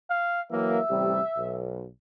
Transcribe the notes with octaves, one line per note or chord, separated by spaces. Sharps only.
F5
E3 F#3 A#3 E5
A1 C3 G3
B1